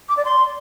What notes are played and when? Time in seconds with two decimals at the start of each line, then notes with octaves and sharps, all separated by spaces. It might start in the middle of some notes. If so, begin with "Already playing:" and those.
0.09 D6
0.17 D5
0.25 C6